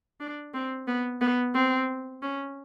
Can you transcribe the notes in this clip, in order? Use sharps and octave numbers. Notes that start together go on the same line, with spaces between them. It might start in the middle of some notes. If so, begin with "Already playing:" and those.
D4
C4
B3
B3
C4
C#4